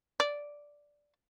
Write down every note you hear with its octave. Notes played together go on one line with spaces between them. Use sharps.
D5